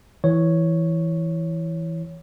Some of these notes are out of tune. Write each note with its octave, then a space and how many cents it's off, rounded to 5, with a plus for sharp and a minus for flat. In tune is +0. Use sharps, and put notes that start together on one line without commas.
E3 +0 C#5 +0